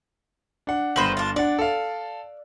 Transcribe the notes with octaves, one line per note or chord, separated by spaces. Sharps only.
D4 F#5
G1 D#3 B4 C5 C6 F#7
D4 F4
D4 D5 F#5
A4 F5